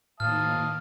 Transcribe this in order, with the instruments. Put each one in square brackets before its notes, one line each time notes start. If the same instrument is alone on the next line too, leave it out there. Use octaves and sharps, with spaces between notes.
[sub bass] A2 [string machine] D#3 A#3 [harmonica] F5 A5 D#6 [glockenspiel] F6